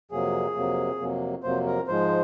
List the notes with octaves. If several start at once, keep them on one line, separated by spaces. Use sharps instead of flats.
F2 C3 F#3 A#3 G#4
F2 C3 F#3 A#3
F2 C3 F#3 A#3
F2 C3 F#3 A#3 C5
A#4
G#2 F3 G#3 C5